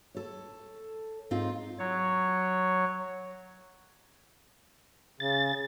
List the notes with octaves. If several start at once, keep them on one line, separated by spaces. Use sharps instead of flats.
A4 C#5
G#2 C4 D#4 F4
F#3 C#5
C#3 A6